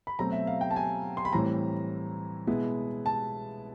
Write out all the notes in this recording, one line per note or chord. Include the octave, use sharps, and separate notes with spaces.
B5
B2 F#3 A3 C4 A#5
E5
F5
G5
A5
G#5
C6
B5
A2 E3 G3 C4 A#5
B2 G#3 B3 E4
A5